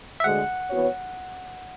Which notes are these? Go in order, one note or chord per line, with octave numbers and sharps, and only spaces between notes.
E5
D2 D3 G#3 F#5
E3 B3 F#4 C#5